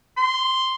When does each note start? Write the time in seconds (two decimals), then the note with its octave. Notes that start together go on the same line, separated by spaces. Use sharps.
0.17 C6